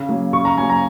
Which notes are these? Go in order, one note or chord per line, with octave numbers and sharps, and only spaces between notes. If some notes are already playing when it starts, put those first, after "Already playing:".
Already playing: C#3
F#3 A#3
C#3 C#6
A#5
F#3 A#3 G#5
A#5